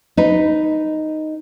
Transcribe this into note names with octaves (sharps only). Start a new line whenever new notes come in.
D#4 B4